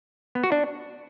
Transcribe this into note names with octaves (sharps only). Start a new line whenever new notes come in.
B3
F#4
D4